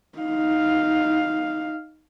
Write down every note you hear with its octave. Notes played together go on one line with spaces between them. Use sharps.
D#4 F5